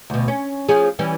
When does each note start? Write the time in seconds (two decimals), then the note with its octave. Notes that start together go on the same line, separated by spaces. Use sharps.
0.10 D2 B2
0.28 C#4
0.69 F3 C#4 G#4
0.99 E3 G3 C#4